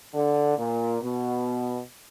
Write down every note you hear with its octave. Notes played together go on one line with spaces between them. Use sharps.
D3
A#2
B2